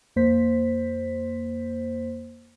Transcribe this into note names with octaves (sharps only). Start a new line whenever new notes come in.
F2 A#3 C5 B6